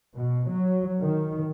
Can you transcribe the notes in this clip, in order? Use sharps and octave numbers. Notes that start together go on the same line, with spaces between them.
B2
F#3
D#3